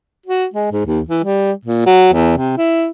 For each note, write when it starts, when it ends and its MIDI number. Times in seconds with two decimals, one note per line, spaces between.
0.26 0.46 66
0.54 0.68 56
0.72 0.82 44
0.86 1.00 39
1.09 1.23 52
1.24 1.52 55
1.65 1.83 46
1.86 2.08 54
2.13 2.32 40
2.37 2.57 48
2.57 2.88 64